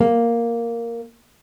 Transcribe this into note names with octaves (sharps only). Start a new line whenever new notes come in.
A#3